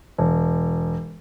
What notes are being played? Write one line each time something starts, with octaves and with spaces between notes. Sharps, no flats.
E1